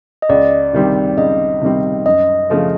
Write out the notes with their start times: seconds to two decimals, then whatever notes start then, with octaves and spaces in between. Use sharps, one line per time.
0.22 D#5
0.29 C#2 D5
0.73 C3 D#3 G3 C4
1.17 C#2 D#5
1.62 C3 D#3 G3 C4
2.06 F#2 D#5
2.50 C#3 F3 A3